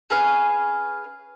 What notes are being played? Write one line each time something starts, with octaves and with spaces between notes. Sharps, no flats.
C#4 G#4 B4 F5